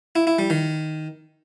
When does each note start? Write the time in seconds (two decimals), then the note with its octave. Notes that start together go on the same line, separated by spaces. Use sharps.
0.16 E4
0.27 E4
0.39 G3
0.50 D#3